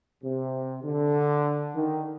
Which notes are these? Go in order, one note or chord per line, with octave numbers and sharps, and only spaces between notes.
C3
D3
D#3